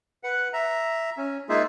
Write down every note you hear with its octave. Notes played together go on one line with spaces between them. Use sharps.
B4 F#5
E5 A#5
C#4
G#3 A#3 D#4 F4 G#4 E5